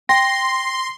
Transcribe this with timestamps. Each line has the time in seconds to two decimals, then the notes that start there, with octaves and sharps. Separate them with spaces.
0.09 G5 C6 A#6